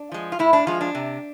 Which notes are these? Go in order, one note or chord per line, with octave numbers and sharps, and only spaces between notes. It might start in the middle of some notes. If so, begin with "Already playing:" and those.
Already playing: D4
F3 G#3
F4
A2 E4
D4
F3 G#3 F4
D4
C3